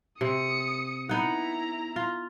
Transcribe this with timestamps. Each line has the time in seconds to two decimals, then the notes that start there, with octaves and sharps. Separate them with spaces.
0.21 C3 D#6 C#7
1.09 B3 D#4 E4 F#5 A#5
1.96 F4